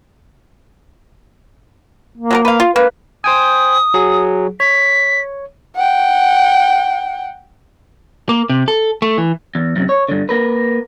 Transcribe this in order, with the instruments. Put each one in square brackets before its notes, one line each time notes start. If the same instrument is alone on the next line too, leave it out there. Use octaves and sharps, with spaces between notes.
[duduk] A#3
[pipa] F#3 G#3 A#4
B4 F5
F4
[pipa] A#3 [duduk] B4
[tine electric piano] C5 G5 G#5 [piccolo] D#6
[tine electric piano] F#3 G#4
[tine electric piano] C#5 [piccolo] B6
[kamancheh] F#5 G5
[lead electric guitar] A#3
C3
A4
A3
E3
[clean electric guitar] E2
F#2 C3
C#5
G2 D3
A#3 A#4 B4